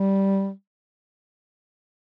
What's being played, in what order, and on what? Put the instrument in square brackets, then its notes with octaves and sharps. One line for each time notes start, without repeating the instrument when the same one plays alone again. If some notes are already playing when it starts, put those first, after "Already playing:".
Already playing: [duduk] G3